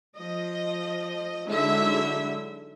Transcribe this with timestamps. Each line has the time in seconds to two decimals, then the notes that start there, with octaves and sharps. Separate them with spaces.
0.16 F3 D#5
1.47 D3 F#3 G#3 D#4 E4 E5